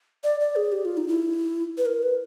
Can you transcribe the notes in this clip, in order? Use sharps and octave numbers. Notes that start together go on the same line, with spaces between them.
D5
D5
G#4
G4
F4
D#4
E4
B4
A#4
B4